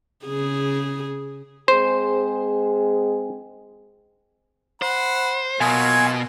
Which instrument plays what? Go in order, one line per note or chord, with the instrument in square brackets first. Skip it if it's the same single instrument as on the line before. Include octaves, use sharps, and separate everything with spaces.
[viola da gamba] C#3 G#4
[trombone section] G#3 C4 G#4 [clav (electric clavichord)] C5
[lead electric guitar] C5 [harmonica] F#5 B5
[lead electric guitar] B2 [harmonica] F#3 A#3 F4 [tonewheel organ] G#5